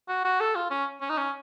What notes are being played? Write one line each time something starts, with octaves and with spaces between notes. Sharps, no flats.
F#4
F#4
A4
F4
C#4
C#4
D#4
C#4